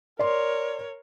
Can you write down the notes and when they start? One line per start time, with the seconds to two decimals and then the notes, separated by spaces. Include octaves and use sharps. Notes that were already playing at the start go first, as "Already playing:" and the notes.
0.19 A#4 C#5 D5 C6